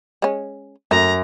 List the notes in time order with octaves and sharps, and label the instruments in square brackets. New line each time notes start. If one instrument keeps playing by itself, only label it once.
[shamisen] G#3 C#4
[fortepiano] F#2 [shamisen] A3 [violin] A#5